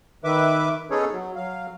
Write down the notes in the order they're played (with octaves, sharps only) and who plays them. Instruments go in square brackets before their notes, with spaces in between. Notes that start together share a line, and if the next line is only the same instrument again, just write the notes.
[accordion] D#3 B4 E5 D6
B3 C#4 D#4 G#4 A4 C#5
F#3
F#3 F5